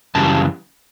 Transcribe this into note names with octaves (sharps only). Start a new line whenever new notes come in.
F#2 C#3 E3 G3 A5